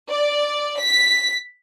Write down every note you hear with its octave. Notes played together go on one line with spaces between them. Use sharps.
D5
B6